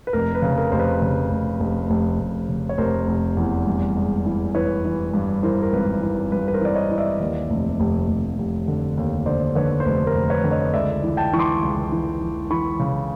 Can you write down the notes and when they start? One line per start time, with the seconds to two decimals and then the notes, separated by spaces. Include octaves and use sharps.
0.07 B4
0.13 F1 A#4
0.35 B4
0.42 C#3
0.47 B4
0.58 A#4
0.72 F1 C5
0.79 B4
1.02 C#3
1.31 F1
1.60 F1
1.90 F1
2.20 F1
2.49 C#3
2.69 C#5
2.78 F1 A#4 C5
3.08 F1
3.37 E2
3.66 G2
3.97 G#3
4.25 E3
4.55 E3 B4 C#5
4.85 E3
5.13 G2
5.43 E3 A#4 C5
5.63 A#4
5.73 G#1 B4
6.02 E3
6.32 G2 B4
6.48 B4
6.54 A#4 C5
6.61 E3 D5
6.75 C#5 D#5
6.90 E3
6.98 D5 E5
7.20 D#2
7.50 F1
7.80 F1
8.08 F1
8.38 F1
8.68 D3
8.98 D#2
9.26 D3 C5 D5
9.55 D3 B4 C#5
9.80 C5
9.85 F1 B4
10.07 A#4 C5
10.14 F1
10.30 B4 C#5
10.44 D3
10.51 C#5 D#5
10.74 C#2 D5 E5
11.03 E3
11.17 G5 A5
11.33 E3 C#6
11.39 C6 D6
11.63 C#2
11.92 E3
12.21 E3
12.50 E3 B5 C#6
12.79 C#3